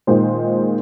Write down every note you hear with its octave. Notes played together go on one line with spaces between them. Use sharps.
A#2 D#3 G#3 C5